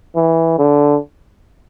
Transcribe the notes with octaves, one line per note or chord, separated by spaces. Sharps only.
E3
D3